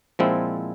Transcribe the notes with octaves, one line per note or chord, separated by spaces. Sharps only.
A#2 F3 G#3 C4 E4